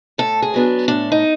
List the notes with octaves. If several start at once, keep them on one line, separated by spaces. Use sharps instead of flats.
A2 A4
G#4
F#3 B3 D4
A2 D4
D#4